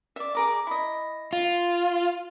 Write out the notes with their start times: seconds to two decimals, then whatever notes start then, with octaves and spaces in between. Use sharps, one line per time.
0.16 D5 E5
0.35 G#4 A#4 D6
0.67 E4 D#5
1.33 F4